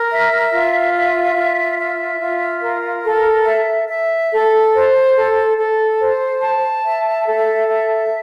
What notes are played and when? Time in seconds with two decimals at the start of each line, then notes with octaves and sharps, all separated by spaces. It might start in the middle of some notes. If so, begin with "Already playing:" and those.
Already playing: A#4
0.10 E5
0.52 F4
0.94 E5
1.36 F4
1.79 E5
2.21 F4
2.63 A#4
3.05 A4
3.47 E5
3.89 E5
4.31 A4
4.74 C5
5.15 A4
5.58 A4
6.00 C5
6.42 A5
6.84 E5
7.26 A4
7.68 E5